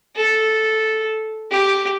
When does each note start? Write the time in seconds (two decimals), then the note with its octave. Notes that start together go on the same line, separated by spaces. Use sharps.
0.16 A4
1.51 G4